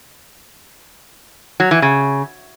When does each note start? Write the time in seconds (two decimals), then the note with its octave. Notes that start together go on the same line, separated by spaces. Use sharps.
1.60 F#3
1.71 E3
1.82 C#3